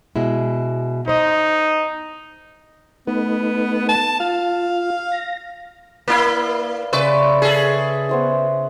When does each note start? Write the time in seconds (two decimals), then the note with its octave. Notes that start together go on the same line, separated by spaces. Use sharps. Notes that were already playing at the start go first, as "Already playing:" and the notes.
0.16 B2 G#3 E4
1.08 D#4 C5 D#5
3.07 A3 B3 D#4 B4
3.89 A5
4.20 F4 F5
5.12 A#6
6.08 A#3 E4 B4 D5 F5
6.93 C#3 B4 D5 E5 C6 C#6 E6
7.42 G#4 A4 B4
8.09 B3 C5 E5